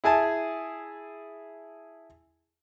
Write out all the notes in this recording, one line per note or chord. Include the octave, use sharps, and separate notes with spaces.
E4 G#4 G#5 A5